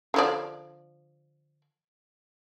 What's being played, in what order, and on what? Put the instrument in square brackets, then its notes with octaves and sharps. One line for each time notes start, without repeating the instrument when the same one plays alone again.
[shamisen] D3 F3 D5